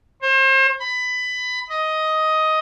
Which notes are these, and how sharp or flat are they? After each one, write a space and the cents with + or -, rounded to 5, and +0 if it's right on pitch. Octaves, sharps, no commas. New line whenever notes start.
C5 +35
B5 +20
D#5 +10